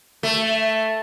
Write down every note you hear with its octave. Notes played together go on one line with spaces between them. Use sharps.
A3